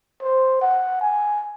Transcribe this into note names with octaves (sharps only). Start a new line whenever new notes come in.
C5
F#5
G#5